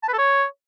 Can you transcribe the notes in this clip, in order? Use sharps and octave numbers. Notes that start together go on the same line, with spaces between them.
A5
B4
A4
C#5